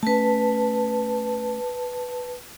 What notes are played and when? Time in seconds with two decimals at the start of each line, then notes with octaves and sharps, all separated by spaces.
0.03 A3 C#4 B4 A5